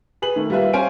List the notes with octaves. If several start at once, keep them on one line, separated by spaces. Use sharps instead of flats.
G#4 B4 F#7
D#3 A3
G3 A#3 F4 B4 E5
C#4 C5 F5 G#5 D7